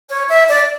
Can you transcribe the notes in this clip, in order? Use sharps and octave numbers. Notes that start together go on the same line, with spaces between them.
C#5
E5
D5